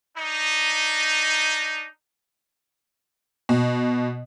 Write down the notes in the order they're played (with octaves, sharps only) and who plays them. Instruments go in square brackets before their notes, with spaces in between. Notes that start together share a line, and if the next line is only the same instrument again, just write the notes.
[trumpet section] D4 D#4
[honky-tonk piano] B2